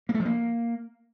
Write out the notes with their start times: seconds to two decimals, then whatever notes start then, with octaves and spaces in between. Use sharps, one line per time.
0.09 A#3
0.14 A3
0.20 F3
0.25 A#3